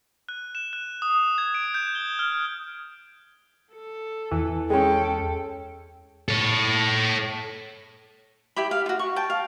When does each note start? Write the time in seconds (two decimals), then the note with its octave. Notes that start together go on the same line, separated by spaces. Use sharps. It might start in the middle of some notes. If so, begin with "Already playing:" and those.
0.29 F#6
0.55 E7
0.73 F#6
1.02 D#6
1.38 G#6
1.54 D7
1.74 G6
1.95 G7
2.19 F6
3.73 A4
4.31 E2 E3
4.70 G#3 C#4 A4 G5
6.29 A4 C#5
8.56 E4 G4 B5
8.71 F5
8.86 F4 F#4
8.99 C#6
9.16 G5 A5
9.30 F5